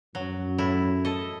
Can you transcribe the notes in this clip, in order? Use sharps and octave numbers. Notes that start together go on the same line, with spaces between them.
F#2 F#3
A2 E4
A4 D#5